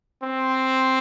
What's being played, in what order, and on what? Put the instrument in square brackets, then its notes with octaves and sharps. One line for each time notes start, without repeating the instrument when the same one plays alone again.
[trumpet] C4